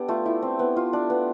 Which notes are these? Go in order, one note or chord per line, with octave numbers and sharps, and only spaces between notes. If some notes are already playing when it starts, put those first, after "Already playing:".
Already playing: B3 D4 G4 A4
A3 F4
E4
C4
B3
F4
D4
B3